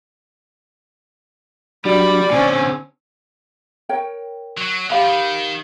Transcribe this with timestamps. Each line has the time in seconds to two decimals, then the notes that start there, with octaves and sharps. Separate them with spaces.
1.85 F#3 G3 D4 F#4 D5 B5
2.31 A#2 D3 C4 C#4 G#5
3.89 A#4 C#5 G5
4.58 F#3
4.90 F3 G4 F5 B5
5.05 D#3